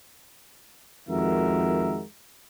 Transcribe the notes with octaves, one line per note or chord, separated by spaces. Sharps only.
F2 D#3 G#3 F#4 A#4 E5